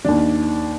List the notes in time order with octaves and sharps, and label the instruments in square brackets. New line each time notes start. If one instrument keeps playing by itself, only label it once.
[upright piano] D#2 D#3 D4